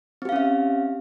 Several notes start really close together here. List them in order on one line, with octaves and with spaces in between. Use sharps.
C4 G4 F5 C#4 E5